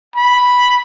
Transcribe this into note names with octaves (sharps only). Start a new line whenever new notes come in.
B5